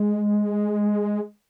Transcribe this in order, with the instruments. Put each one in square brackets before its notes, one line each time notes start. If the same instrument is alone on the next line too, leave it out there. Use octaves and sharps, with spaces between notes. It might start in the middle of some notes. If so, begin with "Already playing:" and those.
Already playing: [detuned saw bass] G#3